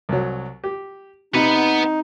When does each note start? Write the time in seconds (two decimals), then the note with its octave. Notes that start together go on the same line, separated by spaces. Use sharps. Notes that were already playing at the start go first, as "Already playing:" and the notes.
0.09 C2 F#3
0.64 G4
1.34 C3 D#4 B4 F#5